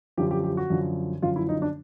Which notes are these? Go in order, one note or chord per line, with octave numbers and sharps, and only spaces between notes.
F#2 D3 F3 G4
G4
G4
F#4
F#2 D3 F3
F#2 D3 F3 F4
E4
D#4
D4